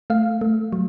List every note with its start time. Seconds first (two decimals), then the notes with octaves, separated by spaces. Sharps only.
0.10 A3 F5
0.41 A3
0.73 F#3